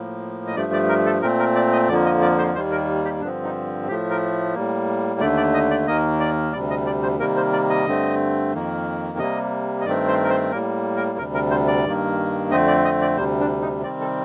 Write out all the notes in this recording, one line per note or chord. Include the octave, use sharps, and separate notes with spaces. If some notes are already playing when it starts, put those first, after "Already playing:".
Already playing: A2 F3 A#3
D#5
G2 F3 A3 D5
D5
A#4
A4
A#2 A3 C4 A#4
A#4
D5
D#5
F2 D3 F3 A#3 D5
D#5
D5
C5
D#2 D#3 G3 A#3 C5
A#4
G4
G2 D3 F3 C4 D4
D#4
A2 F3 A3 G4
A#4
A2 G3 A#3
D#2 D3 A3 D5
D5
D#5
D5
D#2 D#3 A#3 D#5
D5
D2 C3 G3 D5
D#5
D5
C5
C3 D#3 G3 A#3 A#4
C5
D5
D#5
G2 D3 A3 C4
F2 D#3 A#3
C3 G3 A#3 D#5
D#5
G2 D#3 A3 C4 D5
C5
A#4
C5
A2 G3 A#3 A#4
A#4
D2 C3 G3 A#4
A#4
C5
D5
G2 D#3 A#3
F2 D3 A3 C4 D#5
D5
D#5
D5
D2 C3 G3 C5
D4
D#4
C3 D#3 G3 C4 D5
A4